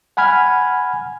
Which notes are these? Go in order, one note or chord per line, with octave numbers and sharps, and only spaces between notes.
F#5 G#5 B5 F6 G#6